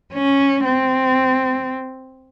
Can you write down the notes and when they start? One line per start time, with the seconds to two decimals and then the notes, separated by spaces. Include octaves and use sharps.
0.14 C#4
0.65 C4